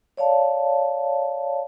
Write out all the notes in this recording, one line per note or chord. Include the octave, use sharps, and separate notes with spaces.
C#5 D5 F5 A5